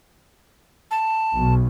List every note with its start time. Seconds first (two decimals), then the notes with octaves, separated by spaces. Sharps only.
0.91 A5
1.36 B1